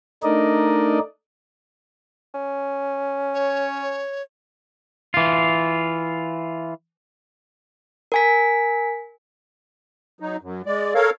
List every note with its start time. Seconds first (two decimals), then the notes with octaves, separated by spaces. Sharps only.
0.23 A3 D4 D#4 A#4 D5 D#5
2.34 C#4
3.34 C#5
5.14 E3 F4
8.12 A#4 G#5 B6
10.20 F#3 D#4
10.41 F#2
10.66 G#3 D5
10.95 A4 A#4 C#5 F5